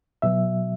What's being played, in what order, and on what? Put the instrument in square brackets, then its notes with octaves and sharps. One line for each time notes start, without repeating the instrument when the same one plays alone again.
[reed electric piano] B2 F#3 E5